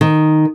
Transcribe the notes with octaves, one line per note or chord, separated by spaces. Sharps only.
D#3